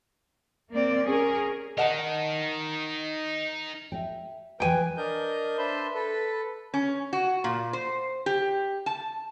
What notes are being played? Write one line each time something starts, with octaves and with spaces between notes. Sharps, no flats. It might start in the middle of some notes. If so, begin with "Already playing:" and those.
A#3 C4 D5
C#4 G#4 A#4
D#4 A#4 D#5 F#5 A5
E5 G5
D2 E3 B4 G5 G#5
D4 A#4 D#5 G6
D4 B4 C5 E5 C6
A4 B4
C#4
F#4
A#2
C5
G4
A5